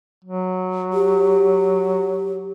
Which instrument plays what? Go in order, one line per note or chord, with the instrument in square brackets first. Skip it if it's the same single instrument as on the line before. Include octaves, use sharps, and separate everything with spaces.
[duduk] F#3
[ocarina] G4